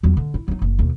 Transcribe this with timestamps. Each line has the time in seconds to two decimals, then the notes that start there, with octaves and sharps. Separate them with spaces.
0.03 E2 F#3
0.17 D3
0.34 E4
0.48 F#3 D#4
0.62 F#1
0.79 D#2 B2